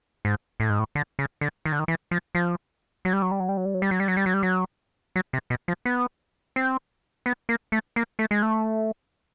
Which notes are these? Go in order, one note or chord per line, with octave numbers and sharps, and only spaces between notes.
G#2
A2
G#2
A2
D3
C#3
D3
D#3
D3
D#3
E3
F3
F3
F#3
G3
F#3
G3
F#3
G3
F#3
G3
F#3
G3
F#3
G3
F#3
G3
F#3
G3
F#3
F#3
C3
B2
F3
B3
C4
B3
A#3
A3
A#3
A3
G#3
A3